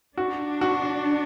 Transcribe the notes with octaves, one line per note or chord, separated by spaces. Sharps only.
D4 F#4
F#4